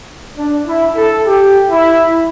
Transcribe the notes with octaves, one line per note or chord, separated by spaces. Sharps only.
D4
E4
A4
G4
E4